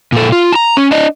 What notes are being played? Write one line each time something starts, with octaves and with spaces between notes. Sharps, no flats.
A#2 A4
F4
A5 A#5
C#4
D4 D#5